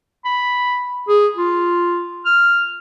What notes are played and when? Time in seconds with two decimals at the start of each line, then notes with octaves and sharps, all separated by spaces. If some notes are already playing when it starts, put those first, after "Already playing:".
0.25 B5
1.08 G#4
1.37 F4
2.26 F6